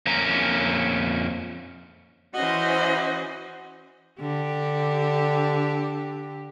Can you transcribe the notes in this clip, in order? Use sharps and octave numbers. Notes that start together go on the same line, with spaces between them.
F2 A#3 C#4 A#5
E3 C#4 F#4 C5 D#5
D3 G4